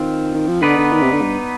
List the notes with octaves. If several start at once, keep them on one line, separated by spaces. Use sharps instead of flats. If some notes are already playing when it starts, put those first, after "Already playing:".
Already playing: D#3 C4 F4
D#3
F3
D3 B3 D#4 B4 D5
D3
D#3
C3
D3
G2